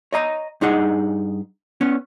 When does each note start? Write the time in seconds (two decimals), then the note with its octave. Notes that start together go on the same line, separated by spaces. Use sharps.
0.13 C#5 D#5 A#5
0.61 G2 D#4 G#4 F#5
1.81 B3 C#4 C#5